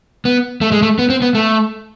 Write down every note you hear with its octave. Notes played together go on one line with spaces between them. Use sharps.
B3
A3
G#3
A3
B3
C4
B3
A3